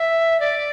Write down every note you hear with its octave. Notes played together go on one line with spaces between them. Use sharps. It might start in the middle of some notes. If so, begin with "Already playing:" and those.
Already playing: E5
D5